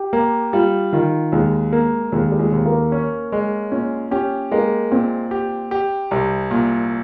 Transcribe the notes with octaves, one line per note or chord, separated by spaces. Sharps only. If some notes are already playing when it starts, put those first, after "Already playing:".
Already playing: G4
A#3
G3 F4
D#3 F4
D#2 G#3
A#3
D#2 G#3
G3
G#3
D#2
A#3
C#4
G#3
A#2 C#4
C#4 G4
G#3 A#3
A#2 C4
G4
G4
C2
A#2